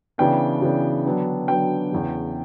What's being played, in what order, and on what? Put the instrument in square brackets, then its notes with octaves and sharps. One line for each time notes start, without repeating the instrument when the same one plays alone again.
[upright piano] C#3 E3 B3 D4 G5
C#3 E3 B3 D4
D3 F#3 B3 D4
D3 F#3 B3 D4 G5
E2 C#3 E3